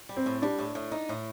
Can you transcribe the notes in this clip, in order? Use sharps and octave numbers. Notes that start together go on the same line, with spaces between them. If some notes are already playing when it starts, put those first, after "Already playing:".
G3
C4
A2
G3 D4
A2
A2
D#4
A2